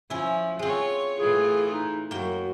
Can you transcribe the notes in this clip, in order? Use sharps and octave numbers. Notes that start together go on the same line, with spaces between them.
F3 C#4 E4
G#3 C4 F4 C#5
A2 E3 F4 G#4
D#4
F#2 A#3 F#4 G5